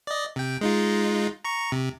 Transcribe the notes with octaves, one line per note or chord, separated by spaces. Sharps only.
D5 D#5
C3 G5
G#3 D#4 F4
A#5 C#6
C3